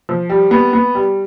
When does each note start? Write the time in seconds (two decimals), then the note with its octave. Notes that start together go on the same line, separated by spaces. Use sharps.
0.09 F3
0.29 G3
0.51 B3
0.73 B3
0.95 G3